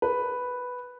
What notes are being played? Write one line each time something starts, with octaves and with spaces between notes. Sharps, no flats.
B4